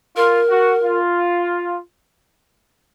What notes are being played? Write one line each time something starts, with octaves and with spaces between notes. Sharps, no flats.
F4 A#4
F#4
F4